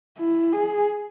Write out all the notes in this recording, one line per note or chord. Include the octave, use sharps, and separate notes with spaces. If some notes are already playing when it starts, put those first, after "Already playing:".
E4
G#4